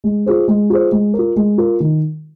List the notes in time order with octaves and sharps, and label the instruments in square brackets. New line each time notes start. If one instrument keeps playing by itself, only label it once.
[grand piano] G#3
F4 G#4 C5
G#3
F4 G#4 C5
G#3
F4 A#4
G#3
F4 A#4
D#3